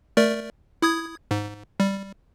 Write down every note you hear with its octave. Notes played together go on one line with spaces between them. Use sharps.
A3 A#4 D5
E4 D#6 G#6
G#2
G3